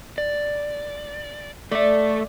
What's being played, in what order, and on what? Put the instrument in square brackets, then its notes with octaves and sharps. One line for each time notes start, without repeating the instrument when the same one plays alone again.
[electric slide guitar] D5
[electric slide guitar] A3 E5 [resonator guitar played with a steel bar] D5